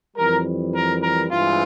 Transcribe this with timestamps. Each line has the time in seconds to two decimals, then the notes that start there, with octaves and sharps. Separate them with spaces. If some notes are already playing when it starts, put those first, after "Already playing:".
0.16 F2 E3 G3 A#4
0.74 A#4
1.02 A#4
1.31 G2 E3 G#3 C4 F4